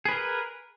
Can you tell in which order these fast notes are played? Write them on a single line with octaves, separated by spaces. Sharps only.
G#4 B4 A#4